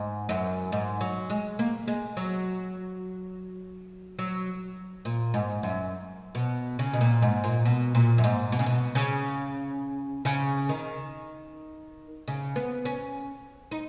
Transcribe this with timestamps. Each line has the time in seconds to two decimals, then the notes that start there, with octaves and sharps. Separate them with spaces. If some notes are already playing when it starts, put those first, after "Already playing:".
Already playing: G#2
0.29 F#2
0.72 G#2
1.01 F#3
1.30 G#3
1.59 A#3
1.88 G#3
2.17 F#3
4.19 F#3
5.05 A#2
5.34 G#2
5.63 F#2
6.35 B2
6.79 C#3
6.93 B2
7.01 A#2
7.22 G#2
7.44 A#2
7.65 B2
7.95 A#2
8.18 F#2
8.24 G#2
8.52 B2
8.59 C#3
8.66 B2
8.95 C#3
10.25 C#3
10.69 D#3
12.28 C#3
12.56 B3
12.85 C#4
13.71 D#4